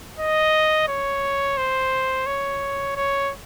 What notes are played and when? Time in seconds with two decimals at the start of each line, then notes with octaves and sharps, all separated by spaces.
0.19 D#5
0.88 C#5
1.57 C5
2.27 C#5
2.96 C#5